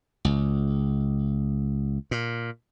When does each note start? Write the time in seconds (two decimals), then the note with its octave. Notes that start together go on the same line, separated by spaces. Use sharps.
0.25 C#2
2.11 A#2